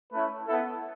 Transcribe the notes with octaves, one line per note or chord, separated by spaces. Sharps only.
A3 C#4 E4 B4
B3 E4 A4